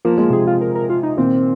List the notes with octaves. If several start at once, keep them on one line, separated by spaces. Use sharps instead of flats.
F3 A#3
G#3 A#3
C3 F3 G#4
F4
A#4
A#4
F4
D#4
A#2 D#3 C4